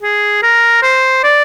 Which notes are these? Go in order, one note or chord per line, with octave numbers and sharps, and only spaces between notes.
G#4
A#4
C5
D5